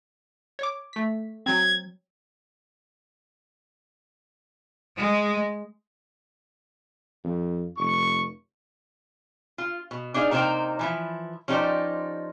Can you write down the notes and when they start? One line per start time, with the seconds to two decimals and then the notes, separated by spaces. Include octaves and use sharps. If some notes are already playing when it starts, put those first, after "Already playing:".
0.59 C#5 D6
0.93 A3 B6
1.46 F#3 C4 G#6
4.97 G#3
7.24 F2
7.78 F1 C#6
9.58 F4
9.91 B2
10.14 D4 D#4 G#4 E5 F5
10.31 C3 A#3 D#4 C5 G5 A#5
10.79 E3 F3 E4
11.48 F3 C#4 D#4 G4 C5 D5